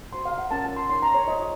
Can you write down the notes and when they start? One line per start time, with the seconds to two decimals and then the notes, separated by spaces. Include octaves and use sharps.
0.13 F#4 C5 C6
0.25 F5
0.38 F#5
0.51 C#4 F4 A#4 C#5 A5
0.64 A5
0.77 C6
0.89 D#4 A#4 C#5 C6
1.02 A#5
1.15 C#5
1.27 F4 C5 D#5